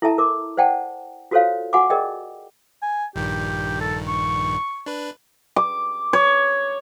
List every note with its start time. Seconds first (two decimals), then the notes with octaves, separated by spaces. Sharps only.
0.02 E4 A4 E5 A5 A#5
0.18 A#4 D6
0.57 C5 D5 F#5 G5 A5
1.31 F4 F#4 A4 C5 C#5 F5
1.73 F#4 F#5 G#5 B5 D6
1.90 G#4 A#4 D5 D#5 G5
2.82 G#5
3.16 A#1 G2 D#3 G4
3.81 A4
4.07 C#6
4.86 D4 B4
5.56 D6
6.13 C#5